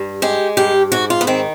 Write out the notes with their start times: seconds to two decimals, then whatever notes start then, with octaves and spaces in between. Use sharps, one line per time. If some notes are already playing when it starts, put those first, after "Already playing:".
Already playing: G2
0.22 G#3 G4
0.57 G2 G4
0.92 G#2 F#4
1.10 F4
1.21 B3
1.27 D#3 C4